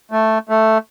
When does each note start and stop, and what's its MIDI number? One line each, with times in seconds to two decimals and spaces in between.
0.11 0.38 57
0.49 0.78 57